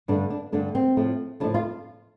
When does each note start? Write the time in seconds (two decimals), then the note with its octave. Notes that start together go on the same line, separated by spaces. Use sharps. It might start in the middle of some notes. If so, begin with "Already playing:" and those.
0.08 G2 D3 A3 D4
0.30 D4
0.52 G2 D3 A3 D4
0.75 C4
0.97 A2 F3 A3
1.40 A2 F3 A3 D4
1.54 F4